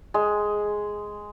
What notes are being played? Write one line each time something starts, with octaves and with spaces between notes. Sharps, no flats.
G#3